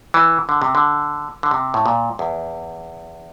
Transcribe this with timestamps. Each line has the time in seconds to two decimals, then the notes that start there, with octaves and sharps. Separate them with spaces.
0.14 E3
0.49 D3
0.62 C3
0.75 D3
1.43 D3
1.51 C3
1.74 A2
1.86 A#2
2.19 E2